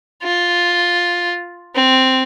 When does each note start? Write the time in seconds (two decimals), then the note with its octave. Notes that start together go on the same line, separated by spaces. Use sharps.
0.22 F4
1.75 C4